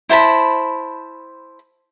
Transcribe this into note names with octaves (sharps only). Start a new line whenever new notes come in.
E4 C5 A5 B5